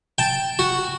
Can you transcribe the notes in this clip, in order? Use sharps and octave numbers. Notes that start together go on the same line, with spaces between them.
G5 A5
F#4